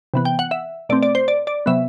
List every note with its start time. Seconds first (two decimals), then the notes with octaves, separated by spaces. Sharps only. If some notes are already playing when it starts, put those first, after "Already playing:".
0.14 C3 E3 B3
0.25 G5
0.39 F#5
0.51 E5
0.89 B2 A3 C4 D5
1.03 D5
1.15 C5
1.28 D5
1.47 D5
1.66 C3 F#3 B3 E5